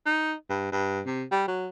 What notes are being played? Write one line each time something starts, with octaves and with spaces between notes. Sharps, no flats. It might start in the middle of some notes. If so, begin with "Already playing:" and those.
D#4
G2
G2
C3
G3
F#3